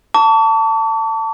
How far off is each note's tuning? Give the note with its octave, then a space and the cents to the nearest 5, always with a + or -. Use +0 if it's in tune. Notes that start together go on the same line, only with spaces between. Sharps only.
A5 +20 C#6 +45